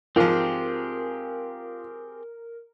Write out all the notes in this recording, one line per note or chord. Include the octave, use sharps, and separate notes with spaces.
G#2 F3 C4 F4 G4 G#4 A#4